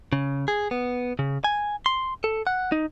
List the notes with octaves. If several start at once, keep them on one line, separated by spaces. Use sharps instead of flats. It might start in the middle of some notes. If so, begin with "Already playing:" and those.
C#3
G#4
B3
C#3
G#5
C6
A4
F#5
D#4